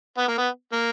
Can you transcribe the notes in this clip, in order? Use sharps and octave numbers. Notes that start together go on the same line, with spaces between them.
B3
A#3
B3
A#3